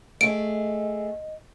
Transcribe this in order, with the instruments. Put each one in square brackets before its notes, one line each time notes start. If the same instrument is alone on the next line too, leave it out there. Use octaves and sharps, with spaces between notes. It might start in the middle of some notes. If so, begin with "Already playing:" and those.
[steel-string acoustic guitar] A3 G#4 [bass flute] D#5 [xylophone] D7